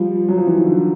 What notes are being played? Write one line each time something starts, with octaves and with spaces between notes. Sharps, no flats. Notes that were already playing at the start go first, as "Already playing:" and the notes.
Already playing: F3 G3
F#3
F3
E3
D#3
D3